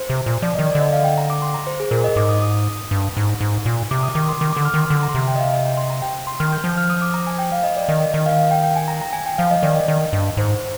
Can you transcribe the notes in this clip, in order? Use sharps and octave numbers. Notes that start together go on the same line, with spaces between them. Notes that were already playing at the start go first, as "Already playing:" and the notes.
Already playing: C5
C3
A#2
F3 D5
D#3 D#5
D5
D3
D#5
F5
G5
A#5
D6
C6
A#5
C5
G#4
A#2 A#4
D#5
G#2 D6
D#6
D#6
G2
G#2
G#2
A#2
C3 D6
D#6
D#3 D6
C6
D#3 D6
D3 D6
F6
D#3 C6
D3 D6
A#5
C6
C3 A#5
G5
D#5
F5
D#5
G5
C6
A#5
G5
C6
D#3 F6
G6
F3 G6
F6
D#6
D6
A#5
G#5
G5
F5
D#5
D5
D#3 D#5
D#5
D#3 D#5
F5
F5
G5
G5
G#5
A#5
A#5
G#5
G5
F3 F5
D#5
D#3 D5
D#5
D#3
G2
G#2 C5